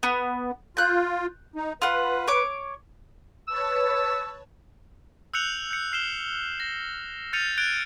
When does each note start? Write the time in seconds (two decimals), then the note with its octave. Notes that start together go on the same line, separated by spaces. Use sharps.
0.03 B3
0.77 F4 F#6 G6
1.56 D#4
1.82 F4 B4 F#5
2.28 C#5 D6
3.48 B4 C#5 A5 E6
5.34 E6 F#6 G6 C#7 F7 F#7
5.71 G6 C#7
5.92 F6 C7 E7 G7
6.60 A#6
7.33 F6 G6 A6 C#7 D#7 F7
7.58 F#6 G#6 A6 D7 G7